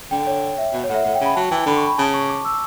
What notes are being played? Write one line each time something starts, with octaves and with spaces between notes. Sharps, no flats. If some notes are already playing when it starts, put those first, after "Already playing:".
D3 G5
C#5
E5
B2
C#5
A2 E5 F#5
A2 F#5
G5
C#3 B5
F#3 A5
E3 G5
D3 B5
C#6
B5
C#3 A5
C#6
D6
E6